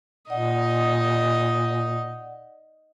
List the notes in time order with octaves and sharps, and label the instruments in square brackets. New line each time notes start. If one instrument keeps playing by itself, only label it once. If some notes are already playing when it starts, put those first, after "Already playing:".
[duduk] A#2 [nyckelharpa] D#4 D#5 [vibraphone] D5 F#5